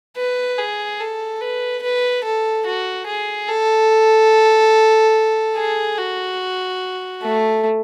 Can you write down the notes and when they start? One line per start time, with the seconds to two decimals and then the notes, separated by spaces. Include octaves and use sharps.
0.17 B4
0.58 G#4
1.00 A4
1.41 B4
1.82 B4
2.24 A4
2.66 F#4
3.07 G#4
3.48 A4
5.57 G#4
5.98 F#4
7.22 A3